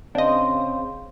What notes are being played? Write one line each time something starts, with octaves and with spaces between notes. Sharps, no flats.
C#3 C4 D4 D#5 F5 C6